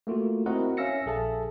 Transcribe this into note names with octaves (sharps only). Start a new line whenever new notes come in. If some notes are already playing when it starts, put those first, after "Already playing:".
A3 A#3 F4 F#4
C4 E4 F#4 A#4 D#5 F#5
C#4 E5 F5 E6 A#6 C#7
A#1 G#4 A4 E5 A5